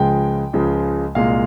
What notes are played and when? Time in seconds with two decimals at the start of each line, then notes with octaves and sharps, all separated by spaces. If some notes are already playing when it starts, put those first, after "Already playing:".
Already playing: C#2 C#3 F3 G#3 G5
0.53 C#2 C#3 F3 G#3
1.15 C2 A#2 G#3 F5